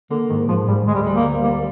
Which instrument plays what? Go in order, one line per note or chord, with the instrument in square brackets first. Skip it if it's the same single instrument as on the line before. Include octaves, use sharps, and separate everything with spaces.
[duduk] D3 [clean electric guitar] A#3
[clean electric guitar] G#2 [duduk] D#3
[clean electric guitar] G#2 [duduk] F3
[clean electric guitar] G#2 [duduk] G3
[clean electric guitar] D2 [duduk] G#3
[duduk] G3
G#3
[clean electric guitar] G3
[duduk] A#3
[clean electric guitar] D2
[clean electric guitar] G3 [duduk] A#3